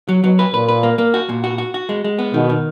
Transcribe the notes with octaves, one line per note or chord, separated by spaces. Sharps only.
F#3
B2 F#3
B4
A#2 B4
B4
A#3
A#3
F#4
A#2
F#4
F#4
F#4
G#3
G#3
B3
B2 D#3
D#3